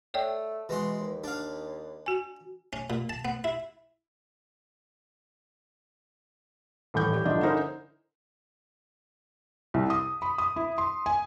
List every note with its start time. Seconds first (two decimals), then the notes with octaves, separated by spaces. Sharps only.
0.14 A3 C#5 D5 G5
0.69 B2 E3 G#3 C6
1.00 D#2
1.24 D4 F5
2.06 F#4 G#5
2.73 C#4
2.90 A#2
3.09 A5
3.25 B3
3.44 E4
6.94 D#1 A2 E3 G6
7.13 G3
7.25 G1 D3 F3 D4 D#5
7.42 D3 C#4 D#4 E4 A#4 C5
9.74 C2
9.90 D#6
10.22 B5
10.38 D#6
10.56 E4
10.78 C6
11.06 G#5